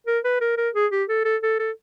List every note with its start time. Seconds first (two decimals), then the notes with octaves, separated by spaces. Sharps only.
0.07 A#4
0.24 B4
0.41 A#4
0.57 A#4
0.75 G#4
0.92 G4
1.09 A4
1.25 A4
1.43 A4
1.59 A4